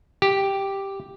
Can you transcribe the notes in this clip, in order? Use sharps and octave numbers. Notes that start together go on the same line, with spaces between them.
G4